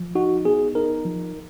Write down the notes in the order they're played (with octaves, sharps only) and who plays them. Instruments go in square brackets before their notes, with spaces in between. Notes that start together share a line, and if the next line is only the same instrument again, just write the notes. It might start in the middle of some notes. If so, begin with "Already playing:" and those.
Already playing: [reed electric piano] F3
[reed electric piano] D#4 [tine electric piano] F#4
[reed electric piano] B3 [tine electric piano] G#4
[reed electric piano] D#4 [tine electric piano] A#4
[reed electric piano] F3